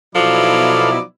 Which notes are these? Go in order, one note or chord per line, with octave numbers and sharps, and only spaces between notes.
B2 F3 F#3 D#4 E4 A4 D5 F5